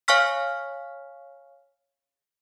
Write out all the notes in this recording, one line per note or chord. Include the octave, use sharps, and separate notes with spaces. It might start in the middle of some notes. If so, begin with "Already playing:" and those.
C#5 F5 G#5 C#6 F6 B6